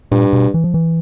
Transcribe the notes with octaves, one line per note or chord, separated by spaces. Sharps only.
G2 A#2
B2
E3
F3
E3